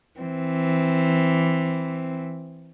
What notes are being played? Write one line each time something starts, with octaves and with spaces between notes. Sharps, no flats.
E3 C4